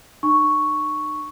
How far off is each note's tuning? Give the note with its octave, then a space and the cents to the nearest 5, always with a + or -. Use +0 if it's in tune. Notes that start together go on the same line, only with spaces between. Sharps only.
D#4 -40 C#6 +0